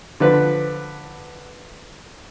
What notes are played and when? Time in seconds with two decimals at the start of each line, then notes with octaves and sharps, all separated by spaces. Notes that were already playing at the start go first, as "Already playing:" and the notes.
0.20 D3 F3 B4